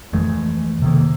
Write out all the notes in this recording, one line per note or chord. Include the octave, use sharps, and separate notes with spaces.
F2 E3 G#3 A3
C3 D#3 A#3